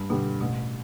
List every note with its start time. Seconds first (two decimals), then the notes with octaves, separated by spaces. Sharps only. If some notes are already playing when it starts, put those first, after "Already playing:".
Already playing: G2
0.10 B2 D3 G3
0.41 A1 B2